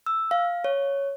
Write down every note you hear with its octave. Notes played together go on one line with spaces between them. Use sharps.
E6
F5
C#5